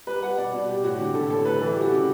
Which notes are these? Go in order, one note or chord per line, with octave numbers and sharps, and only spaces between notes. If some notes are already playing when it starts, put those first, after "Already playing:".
G3 B4
G3 F#5
B2 D5
B2
G3 G4
A2 F#4
D3 G4
D3 A4
A2 A4
G3 B4
E3 A4
G4
G3
F#4
C#3 G4